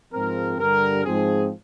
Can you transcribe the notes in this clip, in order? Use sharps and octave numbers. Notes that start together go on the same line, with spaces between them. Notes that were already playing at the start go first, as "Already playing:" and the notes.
G#2 F3 C4 A#4
G2 D3 G3 A#4
G#2 F3 C4 G#4